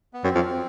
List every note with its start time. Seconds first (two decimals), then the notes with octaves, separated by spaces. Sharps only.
0.13 B3
0.23 F#2 C4
0.35 F2